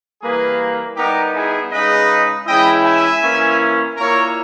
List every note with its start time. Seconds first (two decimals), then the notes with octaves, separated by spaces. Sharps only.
0.22 E3 G3 A#3 G#4 B4
0.97 G3 B3 D#4 G4 A#4
1.34 E4 G#4
1.71 C#3 G#3 D#4 B4 D#5
2.47 E3 G#3 C#4 E4 D#5 G5
2.84 E5 G#5
3.21 E3 A#3 C#4 E4
3.97 A#2 A#3 E4 A#4 C#5